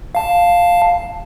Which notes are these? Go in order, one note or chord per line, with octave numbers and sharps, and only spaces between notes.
F5 A5